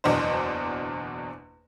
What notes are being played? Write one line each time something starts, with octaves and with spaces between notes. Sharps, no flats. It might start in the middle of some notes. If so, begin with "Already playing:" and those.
F#1 E2 B2 D4 C5